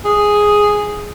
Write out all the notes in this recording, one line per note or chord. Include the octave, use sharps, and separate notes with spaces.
G#4